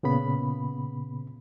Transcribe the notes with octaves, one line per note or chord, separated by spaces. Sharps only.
A#2 C#3 B3 B5